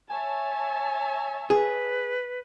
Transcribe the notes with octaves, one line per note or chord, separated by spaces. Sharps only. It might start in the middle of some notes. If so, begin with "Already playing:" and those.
C#5 E5 G#5 A5
G#4 B4